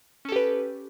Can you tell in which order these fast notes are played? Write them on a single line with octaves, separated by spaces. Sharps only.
C#4 A4 G4 B4